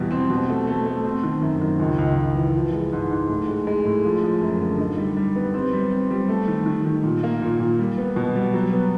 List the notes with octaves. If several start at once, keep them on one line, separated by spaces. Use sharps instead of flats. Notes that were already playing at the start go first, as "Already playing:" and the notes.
Already playing: E2 B2 G3
C4
B2
A3
A3
A3
C4
D#3
F#2
D#3
C#2
C#2
C#2
E3
F3
G#3
G#2
G#2
A2
G#3
G#3
A2
F3
F3
F#2
D3
D#4
G3
G3
B3
C4
G3
C4
G3
A3
D#3
D#3
D#3
A#2
A#3
A#2
A#2
G3
B3
B2
G3
F#3
B3